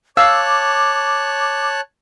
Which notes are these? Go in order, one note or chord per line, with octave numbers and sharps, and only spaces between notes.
C#5 F5 A5 D6 E6 F#6